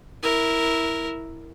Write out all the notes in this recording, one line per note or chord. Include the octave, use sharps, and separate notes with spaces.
E4 A#4